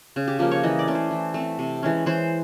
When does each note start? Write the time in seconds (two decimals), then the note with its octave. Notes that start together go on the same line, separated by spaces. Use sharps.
0.16 C#3
0.27 G4
0.39 F3 A#3 G4
0.51 C#5
0.63 E3 D#5
0.79 D5
0.88 A3 C#4
0.95 C5
1.11 E3
1.34 A3 C4
1.59 C3
1.83 E3 G#3 C#4
2.06 E3 C5